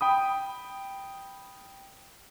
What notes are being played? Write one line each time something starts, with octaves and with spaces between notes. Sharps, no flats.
G5 B5 D#6